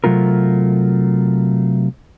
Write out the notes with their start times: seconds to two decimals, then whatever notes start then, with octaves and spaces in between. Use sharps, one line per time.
0.04 C3 F#3 A3 F4 A#4